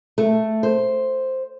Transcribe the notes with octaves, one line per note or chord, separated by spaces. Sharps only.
A3
C5